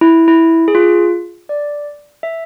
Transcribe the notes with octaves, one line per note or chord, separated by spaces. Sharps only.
E4
E4
G#4
F4
D5
E5